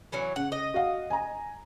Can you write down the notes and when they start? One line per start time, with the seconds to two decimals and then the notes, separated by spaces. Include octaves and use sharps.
0.12 E3 F#3 C#4
0.36 C#3 F#5
0.52 D#5
0.74 F#4 F5
1.10 G#5 A#5